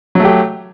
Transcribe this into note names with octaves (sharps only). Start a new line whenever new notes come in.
F#3 A3 G4